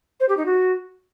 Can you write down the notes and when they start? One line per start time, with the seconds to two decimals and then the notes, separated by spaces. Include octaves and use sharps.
0.20 C5
0.28 G4
0.37 D#4
0.46 F#4